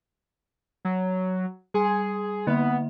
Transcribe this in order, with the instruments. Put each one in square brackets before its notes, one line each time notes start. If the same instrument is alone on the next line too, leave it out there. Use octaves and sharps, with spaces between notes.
[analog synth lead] F#3
[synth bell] G3 C6 [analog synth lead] G#4
[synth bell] D3 A#3 E5 [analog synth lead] B3